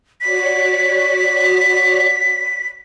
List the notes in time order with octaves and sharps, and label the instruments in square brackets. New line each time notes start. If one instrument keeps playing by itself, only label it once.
[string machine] F#4 C#5 D5 [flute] B6